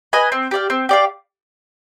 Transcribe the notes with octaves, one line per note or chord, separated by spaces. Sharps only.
B4 D#5 G#5
C4
G4 D5 F5
C4
G4 D5 F5